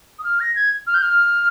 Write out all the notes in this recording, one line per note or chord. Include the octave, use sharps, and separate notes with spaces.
D#6
F6
A#6
G#6
F6
G6
F6